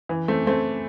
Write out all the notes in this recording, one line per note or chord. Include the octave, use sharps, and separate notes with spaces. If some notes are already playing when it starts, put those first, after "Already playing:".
E3
A3 C4
A3 C4